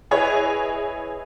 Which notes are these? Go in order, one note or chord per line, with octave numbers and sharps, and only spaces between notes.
E4 G#4 B4 C#5 D#5